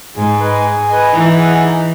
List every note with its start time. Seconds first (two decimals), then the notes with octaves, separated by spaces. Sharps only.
0.16 G#2 G#4
0.40 B4 D#5 G#5
0.65 G#4
0.88 B4 D#5 G#5
1.12 E3 D#4
1.37 G#4 D#5 F#5
1.61 D#4